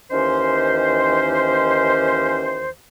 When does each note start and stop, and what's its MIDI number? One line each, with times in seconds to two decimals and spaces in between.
0.11 2.70 39
0.11 2.70 51
0.11 2.70 52
0.11 2.70 61
0.11 2.70 72